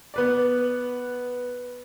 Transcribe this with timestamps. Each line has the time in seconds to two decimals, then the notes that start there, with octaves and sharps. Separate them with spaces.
0.14 B3 B4 D5